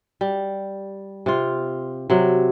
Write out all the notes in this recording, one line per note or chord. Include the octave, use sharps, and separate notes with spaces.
G3
C3 F4
C3 F#3